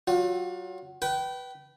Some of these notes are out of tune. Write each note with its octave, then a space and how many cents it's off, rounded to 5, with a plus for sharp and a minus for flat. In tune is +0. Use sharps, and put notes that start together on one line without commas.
F#3 +25 F4 +35
B4 +0 G5 -25